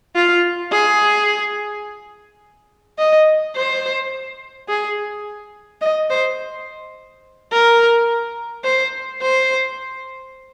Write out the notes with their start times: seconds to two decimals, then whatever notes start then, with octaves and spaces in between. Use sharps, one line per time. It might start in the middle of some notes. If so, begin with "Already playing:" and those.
0.16 F4
0.72 G#4
2.98 D#5
3.56 C5
4.68 G#4
5.82 D#5
6.10 C5
7.52 A#4
8.64 C5
9.22 C5